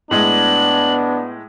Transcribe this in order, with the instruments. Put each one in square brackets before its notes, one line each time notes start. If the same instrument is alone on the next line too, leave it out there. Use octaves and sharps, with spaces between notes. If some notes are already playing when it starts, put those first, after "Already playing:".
[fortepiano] A2 G#3 [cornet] B3 [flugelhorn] D4 [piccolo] F#7